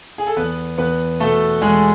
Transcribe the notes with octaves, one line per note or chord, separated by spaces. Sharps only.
G#4
A4
E2 B3 B4
E2 B3 B4
B2 A3 A4
E2 G#3 G#4